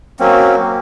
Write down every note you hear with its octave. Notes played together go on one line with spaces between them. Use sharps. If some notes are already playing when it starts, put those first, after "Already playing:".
F#3 A#3 C4 C#4